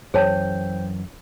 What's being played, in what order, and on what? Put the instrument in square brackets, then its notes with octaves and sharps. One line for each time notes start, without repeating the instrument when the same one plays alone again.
[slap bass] F#2 E3 [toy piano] G#4 C#5 A5 [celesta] C5 G5 G6